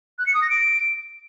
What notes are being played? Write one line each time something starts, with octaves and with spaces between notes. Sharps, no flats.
F#6
C#7
D#6
A#6
D7